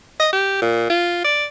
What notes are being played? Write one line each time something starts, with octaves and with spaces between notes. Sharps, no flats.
D#5
G4
A#2
F4
D5